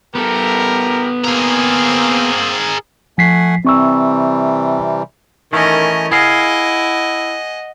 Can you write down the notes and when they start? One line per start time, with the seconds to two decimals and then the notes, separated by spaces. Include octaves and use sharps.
0.15 B3 E4 G4 A4 A#4
1.24 A#3 C4 G#4 A#4
3.18 F3 A3 F#5 G#5 B6 C7
3.65 C3 E3 G3 C4 C#6 E6
5.53 D#3 E3 A3 C#4 A#4 D#5
6.12 E4 G#4 D#5 F5 F#5